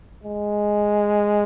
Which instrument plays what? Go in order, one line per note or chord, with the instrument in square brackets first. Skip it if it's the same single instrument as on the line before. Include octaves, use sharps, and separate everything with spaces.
[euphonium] G#3